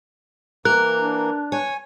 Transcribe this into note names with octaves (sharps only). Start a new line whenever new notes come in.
E3 A#3 A#4 F#6
D4
C#5 G#5